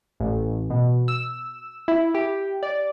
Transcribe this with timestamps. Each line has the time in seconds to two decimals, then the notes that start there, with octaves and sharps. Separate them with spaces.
0.20 A1
0.70 B2
1.08 E6
1.88 E4
2.15 G4
2.63 D5